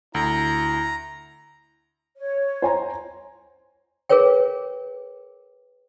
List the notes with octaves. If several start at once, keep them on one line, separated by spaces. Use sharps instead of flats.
D2 E4 A#5
C#5
C5 G#5 A#5
G#4 A#4 B4 C#5 G5